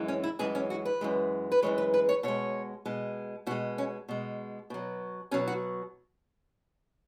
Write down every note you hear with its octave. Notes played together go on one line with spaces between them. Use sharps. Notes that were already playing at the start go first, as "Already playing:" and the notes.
Already playing: F#2 E3 G#3
C#4
E4
F#2 E3 G#3 G#4
C#4
F#4
B4
F#2 E3 G#3
B4
F#2 E3 G#3 C#5
B4
B4
C#5
B2 G#3 C#5
B2 G#3
B2 G#3 F#4
C#4
B2 G#3
B2 F#3
B2 F#3 C#4
F#4